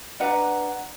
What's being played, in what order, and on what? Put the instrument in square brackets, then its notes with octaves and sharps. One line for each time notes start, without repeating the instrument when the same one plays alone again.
[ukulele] D4 B4 F#5 A#5